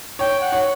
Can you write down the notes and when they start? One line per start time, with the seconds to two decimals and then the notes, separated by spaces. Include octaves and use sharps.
0.19 C#5 G5
0.41 F#5
0.52 C#5